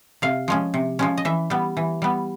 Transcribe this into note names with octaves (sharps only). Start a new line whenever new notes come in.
C3 F5
F3 G#3 C#4
C3
F3 G#3 C#4
D#5
E3 E5
G3 B3
E3
G3 B3